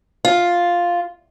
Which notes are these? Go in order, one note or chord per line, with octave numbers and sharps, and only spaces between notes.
F4